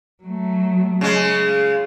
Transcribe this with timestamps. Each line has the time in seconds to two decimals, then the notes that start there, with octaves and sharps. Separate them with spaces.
0.24 F#3 A3
1.01 C#3 G#3
1.48 F4